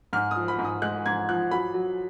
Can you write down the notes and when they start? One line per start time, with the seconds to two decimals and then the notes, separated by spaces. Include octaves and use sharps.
0.13 G#2 F6
0.31 D#6
0.36 F3
0.48 B5
0.59 G#2
0.65 D#6
0.82 G#3 F#6
1.06 G#2 G#6
1.29 F3 F#6
1.51 F#3 B5
1.74 F#3